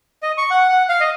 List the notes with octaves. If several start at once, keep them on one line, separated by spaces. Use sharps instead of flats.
D#5
C#6
F#5
F#5
F5
D#5